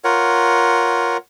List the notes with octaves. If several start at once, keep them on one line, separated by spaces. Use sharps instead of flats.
F4 A#4 C#5 F#5